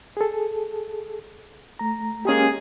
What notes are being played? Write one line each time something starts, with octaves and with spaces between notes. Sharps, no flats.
G#4 A4
A3 A#5
G#3 A#3 C#4 G4 G#4